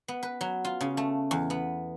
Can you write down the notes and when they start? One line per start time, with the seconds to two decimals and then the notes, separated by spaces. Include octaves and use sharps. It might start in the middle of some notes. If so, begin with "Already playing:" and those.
0.08 B3
0.23 B4
0.41 F#3
0.65 F4
0.81 C#3
0.97 A3
1.31 E2
1.50 B3